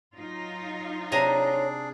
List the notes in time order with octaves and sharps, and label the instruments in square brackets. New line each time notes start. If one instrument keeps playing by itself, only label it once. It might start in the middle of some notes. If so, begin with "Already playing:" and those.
[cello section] F#3 D#4 F4
[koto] C3 G#5 A#5 [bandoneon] D4 G#4 [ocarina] C#5